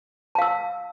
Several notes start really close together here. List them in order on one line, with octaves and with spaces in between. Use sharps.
A5 F5 E6